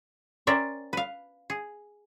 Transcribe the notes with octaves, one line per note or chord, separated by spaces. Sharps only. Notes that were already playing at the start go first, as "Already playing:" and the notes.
C#4 A#4 C5 D5 E5 G5
B4 F5
G#4